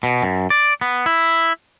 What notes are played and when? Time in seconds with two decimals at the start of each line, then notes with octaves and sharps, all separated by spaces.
0.03 B2
0.22 F#2
0.50 D5
0.81 B3
1.06 E4